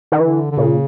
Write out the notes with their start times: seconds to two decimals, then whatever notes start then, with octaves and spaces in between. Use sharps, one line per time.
0.12 D#3
0.20 D3 E3
0.51 D3
0.57 A#2 C#3